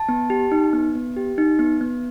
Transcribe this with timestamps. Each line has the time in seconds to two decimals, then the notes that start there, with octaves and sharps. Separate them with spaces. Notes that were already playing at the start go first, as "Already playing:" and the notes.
Already playing: A5
0.09 B3
0.30 G4
0.52 D#4
0.73 B3
0.95 B3
1.16 G4
1.38 D#4
1.59 B3
1.81 B3